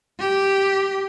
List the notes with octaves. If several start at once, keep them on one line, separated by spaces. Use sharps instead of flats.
G4